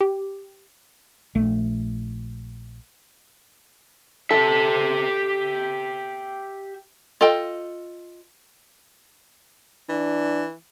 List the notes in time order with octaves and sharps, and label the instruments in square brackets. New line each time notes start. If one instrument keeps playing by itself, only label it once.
[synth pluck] G4
[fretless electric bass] A#1 A3
[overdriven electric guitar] G4 E5 [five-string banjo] A4
[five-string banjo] F4 A4 D#5 G5
[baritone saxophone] E3 [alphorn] D4